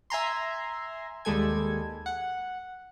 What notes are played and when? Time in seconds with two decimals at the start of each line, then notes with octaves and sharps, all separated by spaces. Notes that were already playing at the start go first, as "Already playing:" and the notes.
0.10 E5 G#5 A#5 C6
1.25 D#2 G3 G#3 A4 G#5 G#6
2.06 F#5